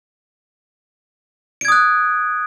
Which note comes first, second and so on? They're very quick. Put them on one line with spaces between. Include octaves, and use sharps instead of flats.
D7 G#6 D#6 F#6